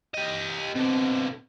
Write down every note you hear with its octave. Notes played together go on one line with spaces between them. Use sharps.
G4 D#5
B2 D3 C4